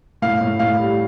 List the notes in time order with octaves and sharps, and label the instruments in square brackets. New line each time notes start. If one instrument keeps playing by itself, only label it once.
[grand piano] A2 [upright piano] F5
[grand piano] A2
[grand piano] A2 [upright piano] F5
[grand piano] G3